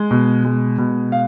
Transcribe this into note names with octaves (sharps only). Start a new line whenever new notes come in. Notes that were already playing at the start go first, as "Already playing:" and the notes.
Already playing: G#3
B2
G#3
B2
F5